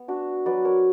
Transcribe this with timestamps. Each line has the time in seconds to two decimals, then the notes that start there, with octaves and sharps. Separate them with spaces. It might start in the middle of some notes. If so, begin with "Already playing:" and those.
Already playing: B3
0.08 D4 F#4
0.46 F#3 B4 D5
0.65 A#4 C#5